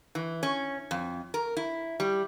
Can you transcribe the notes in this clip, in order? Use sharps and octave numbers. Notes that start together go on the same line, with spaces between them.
E3
C#4
F2
A#4
E4
G3